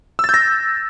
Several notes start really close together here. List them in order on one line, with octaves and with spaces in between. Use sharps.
E6 A6 G6 A#6